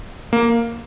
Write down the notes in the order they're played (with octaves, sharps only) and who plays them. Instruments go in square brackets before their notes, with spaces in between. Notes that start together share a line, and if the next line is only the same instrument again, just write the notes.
[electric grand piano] A#3